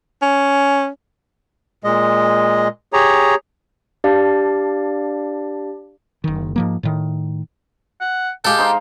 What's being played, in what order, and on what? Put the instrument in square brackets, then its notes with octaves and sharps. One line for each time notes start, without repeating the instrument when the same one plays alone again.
[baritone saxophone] C#4
[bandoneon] A#2 G#3 D#5
G4 G#4 C#5 A#5
[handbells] D4 G4 D5 F5 A5
[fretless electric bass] F#1 D#3
G#2 F3 A#3
A2 D#3
[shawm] F#5
[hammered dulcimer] G#3 F5 [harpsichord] G4 A4 [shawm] G5
[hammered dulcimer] D#4 C5